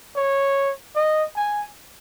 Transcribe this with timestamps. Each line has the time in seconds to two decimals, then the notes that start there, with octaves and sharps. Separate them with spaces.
0.16 C#5
0.96 D#5
1.36 G#5